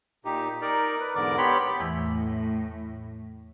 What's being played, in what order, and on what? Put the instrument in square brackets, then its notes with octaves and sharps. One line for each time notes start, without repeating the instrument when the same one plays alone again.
[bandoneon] A#2 D#4 G4
D#4 A#4 D5
B4
E2 G#2 D3 A#4 D5 D6
B3 G4 C#5 B5 C6
[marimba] E2 E3 E6 [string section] A2